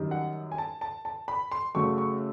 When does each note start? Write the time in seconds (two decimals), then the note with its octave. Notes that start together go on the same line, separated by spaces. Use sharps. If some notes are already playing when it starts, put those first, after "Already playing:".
Already playing: F#2 D#3 G3
0.11 F#5
0.52 G#5
0.58 A5
0.81 A5
1.05 A5
1.28 B5
1.52 C6
1.75 F#2 C#3 F#3 A3 C#6
1.98 C#6